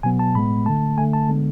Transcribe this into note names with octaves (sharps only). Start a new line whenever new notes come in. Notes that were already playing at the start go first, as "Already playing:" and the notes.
B2 F#3 B3 G#5
A5
A2 G#3 B3 B5
D3 A3 A5
D3 A3 G#5
A5
D3 G#3 B3